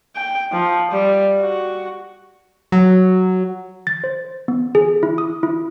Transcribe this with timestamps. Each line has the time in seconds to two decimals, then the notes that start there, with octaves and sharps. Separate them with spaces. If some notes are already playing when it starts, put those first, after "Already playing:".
0.16 G5
0.52 F3
0.91 G3
1.41 F#4
2.72 F#3
3.87 A6
4.04 C5
4.48 B3
4.75 G#4
5.03 E4
5.18 D#6
5.43 E4